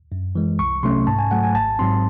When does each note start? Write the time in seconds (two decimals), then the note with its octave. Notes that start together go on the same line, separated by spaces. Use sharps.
0.12 F#2
0.35 E3 G#3
0.59 C2 C#6
0.83 C3 F#3 A3 C#4 C6
1.07 G#2 A5
1.19 G#5
1.31 F#3 A3 F#5
1.44 G#5
1.55 G#1 A5
1.79 G#2 F#3 C4 C6